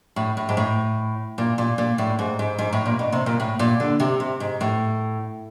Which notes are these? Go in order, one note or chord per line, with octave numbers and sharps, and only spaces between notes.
A2
A2
G#2
A2
A#2
A#2
A#2
A2
G#2
G#2
G#2
A2
A#2
B2
C3
A#2
A2
A#2
D3
C3
C3
G#2
A2